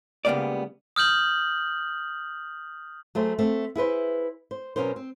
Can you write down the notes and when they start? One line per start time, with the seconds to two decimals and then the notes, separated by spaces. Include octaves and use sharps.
0.25 C#2 C#3 G3 A#3 B3 D5
0.96 D#6 F6 G6 F#7
3.15 F#3 A3 G#4 C5
3.39 A3 C4
3.75 E4 G#4 B4 C5
4.51 C5
4.76 B2 F#3 C#4 A#4 C5
4.96 C4